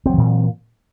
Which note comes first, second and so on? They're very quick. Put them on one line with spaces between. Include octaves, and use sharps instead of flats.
C4 F#3 E3 A#2